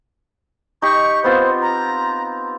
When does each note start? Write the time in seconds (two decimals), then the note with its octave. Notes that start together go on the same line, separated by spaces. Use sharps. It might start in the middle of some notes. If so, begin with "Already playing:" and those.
0.82 D#4 G4 C#6
1.24 B3 C4 F4 C5
1.62 A#5